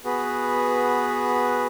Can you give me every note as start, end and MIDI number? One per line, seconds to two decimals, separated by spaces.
0.05 1.67 59
0.05 1.67 66
0.05 1.67 68
0.05 1.67 71